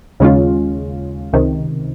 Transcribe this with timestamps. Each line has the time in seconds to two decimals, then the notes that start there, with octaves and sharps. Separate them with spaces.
0.20 D#2 C#3 G#3 C#4 F4
1.33 C#2 C3 D#3